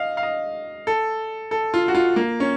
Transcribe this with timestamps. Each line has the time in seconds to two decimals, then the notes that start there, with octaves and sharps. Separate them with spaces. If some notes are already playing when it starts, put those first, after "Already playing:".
Already playing: D#5 F5
0.17 F5
0.23 D#5
0.87 A4
1.51 A4
1.74 F4
1.88 F#4
1.95 F4
2.16 A#3
2.40 C#4